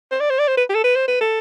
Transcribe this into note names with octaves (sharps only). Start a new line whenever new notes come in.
C5
D5
C5
D5
C5
B4
G4
A4
B4
C5
B4
A4